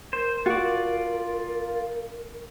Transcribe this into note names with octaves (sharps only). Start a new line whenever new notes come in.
A#4 C5
F4 F#4 D5